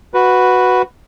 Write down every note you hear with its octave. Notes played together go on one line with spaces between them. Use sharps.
F#4 B4